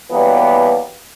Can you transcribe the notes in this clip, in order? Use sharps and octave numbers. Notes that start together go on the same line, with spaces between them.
B2 E3 F#3 G3 A#3 B3